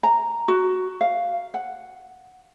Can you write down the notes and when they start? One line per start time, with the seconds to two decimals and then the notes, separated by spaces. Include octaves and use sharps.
0.03 A#5
0.48 F#4
1.01 F5
1.54 F#5